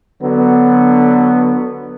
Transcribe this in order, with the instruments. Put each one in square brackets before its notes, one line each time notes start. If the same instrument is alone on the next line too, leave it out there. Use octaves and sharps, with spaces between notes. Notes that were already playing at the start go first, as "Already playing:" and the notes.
[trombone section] D3 F#3 B3